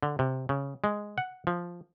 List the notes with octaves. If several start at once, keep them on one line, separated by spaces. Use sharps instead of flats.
D3
C3
C#3
G#3
F#5
F3